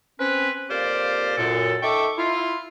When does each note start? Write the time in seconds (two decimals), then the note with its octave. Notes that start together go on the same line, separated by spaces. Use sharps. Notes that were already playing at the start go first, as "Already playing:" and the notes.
0.19 C4 C#4 B4
0.69 F2 A#3 G4 C5 D5 F5
1.37 F#2 A#2 A4
1.82 D#4 A4 E5 G5 C#6 D6
2.17 E4 F4